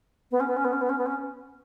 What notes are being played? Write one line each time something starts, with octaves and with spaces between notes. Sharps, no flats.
B3
C#4
B3
C#4
B3
C#4
B3
C#4
B3
C#4